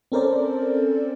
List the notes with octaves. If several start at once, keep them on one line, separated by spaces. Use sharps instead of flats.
C4 C#4 A4 A#4 C5 D5